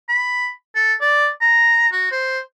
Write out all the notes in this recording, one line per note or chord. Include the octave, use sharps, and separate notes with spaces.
B5
A4
D5
A#5
F#4
C5